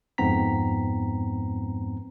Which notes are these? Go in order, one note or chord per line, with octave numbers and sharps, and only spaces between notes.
F2 G#2 B3 C4 A#5 B6